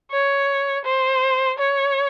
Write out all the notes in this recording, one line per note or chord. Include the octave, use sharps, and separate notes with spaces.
C#5
C5
C#5